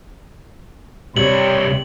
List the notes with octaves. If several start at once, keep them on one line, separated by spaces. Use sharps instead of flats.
C2 C3 G3 C#5 F#7